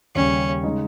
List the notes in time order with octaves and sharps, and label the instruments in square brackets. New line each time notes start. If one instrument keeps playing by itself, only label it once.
[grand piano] D#2 C#3 G3 [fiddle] C#4
[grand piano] C#3 G#3 D#4